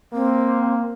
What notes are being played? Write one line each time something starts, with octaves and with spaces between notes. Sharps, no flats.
A#3 C4